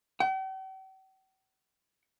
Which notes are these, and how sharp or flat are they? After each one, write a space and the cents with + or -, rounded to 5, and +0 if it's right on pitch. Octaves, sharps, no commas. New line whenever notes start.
G5 -45